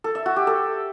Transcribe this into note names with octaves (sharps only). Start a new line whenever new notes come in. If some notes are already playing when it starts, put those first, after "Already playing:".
A4
E5
F#4
G4
A4